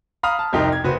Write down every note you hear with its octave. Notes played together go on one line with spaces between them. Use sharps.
F5 A#5 B5 D#6 F6
A5
C2 F2 D#4 G4 A#4 C6
G#6
F#1 F#4 B4 C5